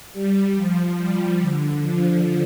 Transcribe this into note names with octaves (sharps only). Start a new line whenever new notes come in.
G3
F3
G3
D3
F3